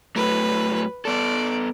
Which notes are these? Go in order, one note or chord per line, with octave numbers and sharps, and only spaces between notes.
A2 F#3 A3 B4
B3 A4 D5